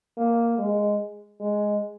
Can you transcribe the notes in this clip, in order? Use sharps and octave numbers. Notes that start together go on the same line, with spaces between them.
A#3
G#3
G#3